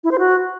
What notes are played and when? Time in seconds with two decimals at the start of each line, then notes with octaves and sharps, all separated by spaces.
0.04 E4
0.11 C5
0.19 F#4